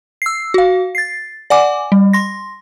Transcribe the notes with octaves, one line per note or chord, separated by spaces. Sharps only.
E6 C7
F#4 F5
A6 C7
D5 F#5 G#5 D6
G3
C6 A#6